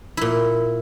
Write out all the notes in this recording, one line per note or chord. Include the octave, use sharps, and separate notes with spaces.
A#2 E4